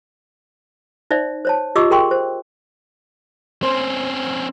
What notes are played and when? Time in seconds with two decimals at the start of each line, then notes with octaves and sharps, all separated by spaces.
1.11 D#4 C5 D5 E5
1.45 C5 C#5 A5
1.75 F4 G4 D#5 C#6 D6 E6
1.91 G#4 A#4 G5 C6 C#6
2.11 C5
3.63 C4 C#4 C5
4.25 F2